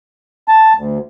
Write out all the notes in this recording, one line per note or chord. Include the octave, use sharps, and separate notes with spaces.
A5
D2